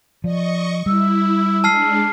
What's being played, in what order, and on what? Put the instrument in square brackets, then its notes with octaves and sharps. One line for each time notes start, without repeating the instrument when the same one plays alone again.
[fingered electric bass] F3 [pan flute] D5 [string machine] D#5 C#6
[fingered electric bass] G3 [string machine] E4 [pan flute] E6
[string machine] G#3 D4 [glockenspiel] A5 F6 C7